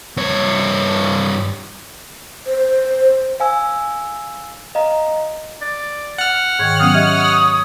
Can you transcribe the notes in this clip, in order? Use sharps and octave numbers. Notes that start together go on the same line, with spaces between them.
G2 C#5
C5
F5 G#5 E6
D#5 F5 A#5
D5
F#5 F6
G#2 D#3 C#5 G5
F#3 B3 C#4 F5 D#6
G4 C#5 D#5 E5